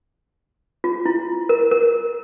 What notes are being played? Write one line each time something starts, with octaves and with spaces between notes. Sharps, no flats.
F4
E4
A#4
A#4